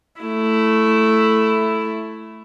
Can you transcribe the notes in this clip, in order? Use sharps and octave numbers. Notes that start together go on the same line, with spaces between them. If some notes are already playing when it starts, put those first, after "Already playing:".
A3 E4